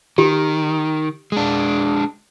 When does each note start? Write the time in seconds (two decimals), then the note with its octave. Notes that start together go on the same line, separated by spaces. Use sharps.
0.18 D#3 G4
1.32 G#3 D4